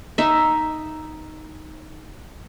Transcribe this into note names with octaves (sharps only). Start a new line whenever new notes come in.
D#4 E5